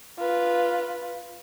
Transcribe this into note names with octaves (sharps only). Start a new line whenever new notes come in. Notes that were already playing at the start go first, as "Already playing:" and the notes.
F4 B4